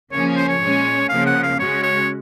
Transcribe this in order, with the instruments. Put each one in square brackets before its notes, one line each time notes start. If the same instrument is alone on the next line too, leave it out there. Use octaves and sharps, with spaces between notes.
[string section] C#3 F3 A#3 C#4 [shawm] C#5
[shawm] C5
C#5
[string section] A#2 G#3 C#4
[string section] C#3 F3 A#3 [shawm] F5
[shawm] F#5
F5
[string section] C#3 G#3 C#4 F#4 [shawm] C#5
[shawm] C#5